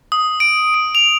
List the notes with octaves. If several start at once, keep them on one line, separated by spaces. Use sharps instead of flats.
D#6
D7
D7
F7